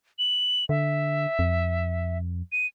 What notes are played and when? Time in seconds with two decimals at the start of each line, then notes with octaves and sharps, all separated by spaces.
0.19 F#7
0.69 D3 E5
1.39 F2
2.52 D#7